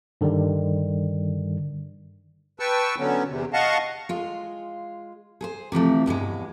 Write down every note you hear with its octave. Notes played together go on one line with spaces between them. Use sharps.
G2 D3 D#3 G3
B4 G5 A5 C#6 E6
D3 F#3 B3 C#4
E2 C3
D#5 F5 F#5 A5 C#6
G#3 F4
G#4 A4 C5
C3 E3 F3 A3
E2 G2 B2 G#3